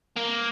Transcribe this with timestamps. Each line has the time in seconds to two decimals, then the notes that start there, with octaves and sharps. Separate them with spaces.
0.17 A#3